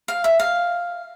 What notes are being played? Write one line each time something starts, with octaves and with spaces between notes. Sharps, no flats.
F5
E5
F5